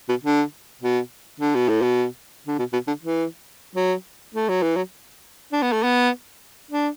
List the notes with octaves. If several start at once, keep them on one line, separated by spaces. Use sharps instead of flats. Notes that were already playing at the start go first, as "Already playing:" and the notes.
B2
D3
B2
D3
B2
A2
B2
D3
B2
B2
D3
E3
F#3
A3
F#3
E3
F#3
D4
B3
A3
B3
D4